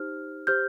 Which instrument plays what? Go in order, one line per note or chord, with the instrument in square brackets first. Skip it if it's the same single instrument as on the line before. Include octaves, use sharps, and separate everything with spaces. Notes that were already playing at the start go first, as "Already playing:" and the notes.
Already playing: [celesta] D#4 G4 C5 F6
G4 C5 F6 G6